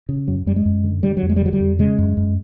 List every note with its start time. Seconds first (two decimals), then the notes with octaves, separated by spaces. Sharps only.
0.09 C#3
0.28 F#2 F#3
0.46 F#2 G3
0.56 G#3
0.65 F#2
0.84 D3
1.03 D3 G3
1.17 F#3
1.22 F2
1.30 G#3
1.36 G3
1.41 D3 F#3
1.53 G3
1.60 F2
1.79 C#3 G#3
1.98 F#2
2.17 F#2